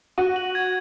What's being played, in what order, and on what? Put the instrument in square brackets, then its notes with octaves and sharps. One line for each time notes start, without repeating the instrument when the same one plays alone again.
[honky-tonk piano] F#4 [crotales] D#7
[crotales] F#7
G#6